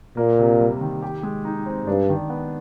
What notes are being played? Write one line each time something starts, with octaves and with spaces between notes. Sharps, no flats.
A#2 A#3
C3
G3
D#3
G4
G#3
D#4
C4
G2 D4
D#3
B3